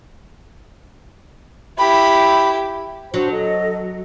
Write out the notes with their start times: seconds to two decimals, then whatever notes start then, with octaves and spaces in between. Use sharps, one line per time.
1.78 E4 G4 B5
3.14 F#3 D4 F#4 C5
3.31 A4 D#5